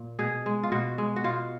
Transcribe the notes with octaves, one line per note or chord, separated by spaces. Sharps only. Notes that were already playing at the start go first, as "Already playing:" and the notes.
Already playing: A#2
B2 G#4
G#3
F4
B2 F#4
G#3
F#4
B2 F4